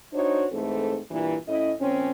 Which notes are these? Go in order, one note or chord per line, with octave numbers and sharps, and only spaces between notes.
D4 D#4 F#4 C5 C#5
G#2 E3 A3 C4 A4
G2 A#2 E3
A2 C#4 E4 D#5
A#2 F3 C4 C#4